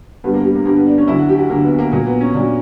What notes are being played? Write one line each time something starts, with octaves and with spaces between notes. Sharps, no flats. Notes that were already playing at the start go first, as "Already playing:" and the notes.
G2 D3 G3 B3
A#3
G3
A#3
G2 D3 G3 A#3
B3
D4
C#4
D2 D3 F#3 E4
F#4
G4
F#4
D2 D3 F#3 A#3
B3
A#3
A#2 F#3 A#3
B3
C#4
A#2 F#3 D4